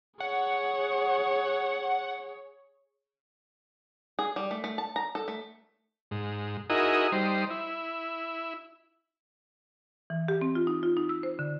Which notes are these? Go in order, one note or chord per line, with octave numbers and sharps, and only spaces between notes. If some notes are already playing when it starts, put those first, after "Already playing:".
G#4 C#5 F#5
G#4
G3
A3
A3
A5
A#5
A4
A3
G#2
D#4 E4 F#4 G#4 A#4 D#5
G3 D#4 C5
E4
E3
G4
C4
F4
D#4
F4
D#4
E6
C5
D3